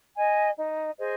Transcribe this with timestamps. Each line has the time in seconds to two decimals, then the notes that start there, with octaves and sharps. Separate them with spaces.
0.16 D#5 G#5
0.57 D#4
0.99 G#4 C5 D#5